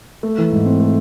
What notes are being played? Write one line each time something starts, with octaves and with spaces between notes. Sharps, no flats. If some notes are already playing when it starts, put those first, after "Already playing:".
A3
E3
G#2
C4
A3